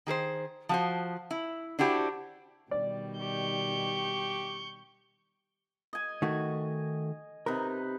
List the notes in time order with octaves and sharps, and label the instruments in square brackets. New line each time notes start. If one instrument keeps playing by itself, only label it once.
[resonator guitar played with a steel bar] D#3 G#4 A4 C5
F3 F#4 C5
E4
D4 E4 F#4 G4 C5
[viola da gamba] B2 D#3 G3 [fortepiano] D5
[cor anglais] G4 [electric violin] C#6 G6
[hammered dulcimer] D#5 G#5
[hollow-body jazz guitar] D#3 A3 F#4
[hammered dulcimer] C3 D#4 B4 [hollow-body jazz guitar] A#4